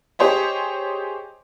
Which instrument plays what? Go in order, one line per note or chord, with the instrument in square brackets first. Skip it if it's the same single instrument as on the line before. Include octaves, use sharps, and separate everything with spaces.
[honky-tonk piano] G4 G#4 C5 C#5 D#5